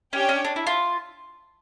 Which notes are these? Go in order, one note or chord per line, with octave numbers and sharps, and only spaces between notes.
C#4 D4 G4 C#5 G5
C#4
D4
E4
F4